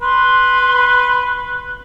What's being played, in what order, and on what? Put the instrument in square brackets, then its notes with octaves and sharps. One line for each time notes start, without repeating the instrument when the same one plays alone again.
[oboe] B4 [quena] C6